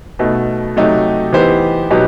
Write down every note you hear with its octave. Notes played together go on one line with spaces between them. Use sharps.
B2 A3 D#4
C3 F#3 A3 D#4 G4
E3 B3 D#4 G4 C5
B2 F#3 B3 D#4 G4